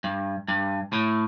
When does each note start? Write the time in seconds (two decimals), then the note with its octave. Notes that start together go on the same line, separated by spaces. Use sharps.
0.04 G2
0.48 G2
0.93 A2